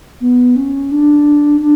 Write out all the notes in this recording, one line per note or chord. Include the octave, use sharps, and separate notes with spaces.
B3
C#4
D4
D4